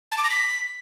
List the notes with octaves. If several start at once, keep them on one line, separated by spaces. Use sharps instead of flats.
A5
D6
A#6
B6